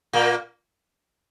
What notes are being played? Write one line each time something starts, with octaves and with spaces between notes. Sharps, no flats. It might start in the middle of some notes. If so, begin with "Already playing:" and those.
A#2 A#3